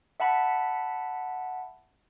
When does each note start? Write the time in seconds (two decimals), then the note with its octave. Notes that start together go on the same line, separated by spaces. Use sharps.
0.20 E5 F#5 A5 B5